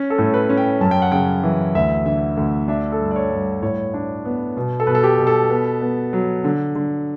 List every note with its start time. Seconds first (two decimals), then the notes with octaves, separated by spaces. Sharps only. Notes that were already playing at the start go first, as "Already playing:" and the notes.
Already playing: C#4
0.10 A4
0.18 A2
0.34 B4
0.50 C#4
0.57 G5
0.81 F#2 A5
0.91 G5
1.02 F#5
1.12 C#3 G5
1.43 E3
1.75 D2 E5
2.05 D3 E5
2.37 D2
2.68 D4 E5
2.92 A4
2.99 G2
3.11 D5
3.16 C#5
3.31 G2
3.62 A2 C#5
3.94 D4
4.25 B3
4.57 B2
4.80 A4
4.87 B2 B4
4.95 A4
5.03 G4
5.19 B2
5.27 A4
5.50 B3
5.81 B3
6.13 F#3
6.44 D3
6.75 D3